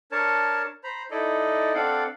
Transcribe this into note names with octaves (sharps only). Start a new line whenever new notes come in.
D4 A#4 C#5 A5
C5 A#5 B5
D#4 E4 A4 D5 D#5
C4 D4 A4 D5 F5 F#5